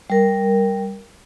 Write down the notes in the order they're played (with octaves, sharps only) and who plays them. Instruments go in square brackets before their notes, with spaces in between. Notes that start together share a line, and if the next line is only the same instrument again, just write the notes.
[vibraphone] G3 A#4